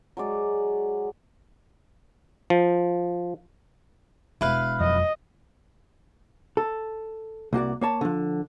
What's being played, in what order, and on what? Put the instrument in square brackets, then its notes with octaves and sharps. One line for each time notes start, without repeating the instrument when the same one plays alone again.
[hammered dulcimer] F#3 G#3 D5
[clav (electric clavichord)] F3
[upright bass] E1 [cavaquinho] E4 B4 F5
[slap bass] F2 F3 F#3 [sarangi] D#5
[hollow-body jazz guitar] A4
C2 A#3 F#4 D5
A#3 C#5 A5
D3 F3